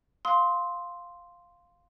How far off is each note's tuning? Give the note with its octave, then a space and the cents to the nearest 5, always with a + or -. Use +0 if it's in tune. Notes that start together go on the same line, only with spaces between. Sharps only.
F5 +5 C6 +0 D#6 +45